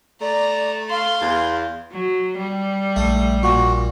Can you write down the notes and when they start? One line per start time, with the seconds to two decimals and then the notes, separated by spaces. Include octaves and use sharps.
0.21 A3 D5 A#5
0.90 F5 C6
1.22 E2
1.91 F#3
2.37 G3
2.96 A#1 A3
3.43 A#2 F#4